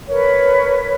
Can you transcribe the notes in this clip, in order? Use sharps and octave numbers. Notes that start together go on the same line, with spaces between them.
A#4 B4 C#5